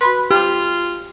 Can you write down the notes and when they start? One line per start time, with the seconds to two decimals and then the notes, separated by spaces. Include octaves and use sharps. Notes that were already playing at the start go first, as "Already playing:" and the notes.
0.01 F#4 B4 B5 C6
0.31 F4 G4